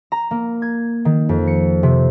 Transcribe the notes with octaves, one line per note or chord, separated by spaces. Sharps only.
A#5
A#3
G#6
D#3
F2
C#7
C3